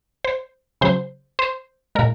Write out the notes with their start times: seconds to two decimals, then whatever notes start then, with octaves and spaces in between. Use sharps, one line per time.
0.24 C5
0.81 C#3 F#3 C5
1.39 C5
1.95 A#2 G#3 A#4